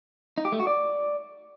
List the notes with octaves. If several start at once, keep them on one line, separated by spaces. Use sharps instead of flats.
D#4
G4
A3
F#4
D5